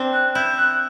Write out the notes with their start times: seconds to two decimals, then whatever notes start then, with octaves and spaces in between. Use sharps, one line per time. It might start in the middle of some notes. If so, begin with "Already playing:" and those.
Already playing: C4 D4
0.13 F#6
0.35 E4 G6
0.57 F#6